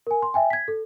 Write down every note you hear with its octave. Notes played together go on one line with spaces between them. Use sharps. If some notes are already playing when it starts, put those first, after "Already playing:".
A#4 G#5
C6
E5 G5 G#5
G#6 B6
A4